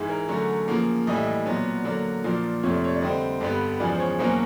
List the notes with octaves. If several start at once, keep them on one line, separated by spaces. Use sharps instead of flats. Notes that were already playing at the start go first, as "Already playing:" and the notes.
Already playing: G#2 E3 G#3
A#4
D3 F#3 A3 C#4
C#3 F3 A#3
A2 E3 G3 D#5
E5
D#5
A#2 F#3 B3 D4
D3 F#3 A#3 D5
A#2 F3 A#3 D4
F2 C3 F3 A3 C#5
D5
C#5
D5
D3 G3 C4 D#5
G2 D3 G3 B3 D4
E2 C#3 F3 G#3 D5
C5
C#5
E2 B2 F#3 A#3 C#4 C5